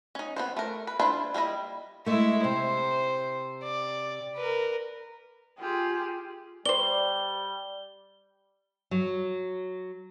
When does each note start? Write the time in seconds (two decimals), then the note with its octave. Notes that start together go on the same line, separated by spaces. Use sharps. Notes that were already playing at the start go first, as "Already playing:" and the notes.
0.15 C#4 D#4
0.36 B3 C4 C5
0.57 A3 A#4
0.87 B4
1.00 D4 E4 F4 B4 C5
1.34 G3 A#3 E4 D#5
2.06 G#3 A3 E4 E5
2.44 C3 C5
3.63 D5
4.36 A#4 B4
5.60 F4 G4 G#4
6.66 G3 C5 D5 G7
8.91 F#3